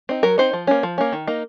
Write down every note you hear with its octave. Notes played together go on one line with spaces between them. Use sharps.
C4 D#4
F#3 A#4
C4 D#4 C5
F3
A#3 C#4
F3
A#3 C#4
D#3
A#3 D#4